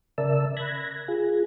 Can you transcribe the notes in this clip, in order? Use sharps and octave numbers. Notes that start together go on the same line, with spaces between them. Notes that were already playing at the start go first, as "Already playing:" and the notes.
C#3 A#4 D5 E5 A5 E6
B5 F#6 G#6 A#6
F4 G#4